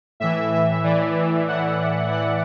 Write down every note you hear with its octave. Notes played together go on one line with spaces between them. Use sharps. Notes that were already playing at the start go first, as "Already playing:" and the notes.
A2 E3 E5
E5
A2 E3 D5
A2 E3 F#5
A2 E3 F#5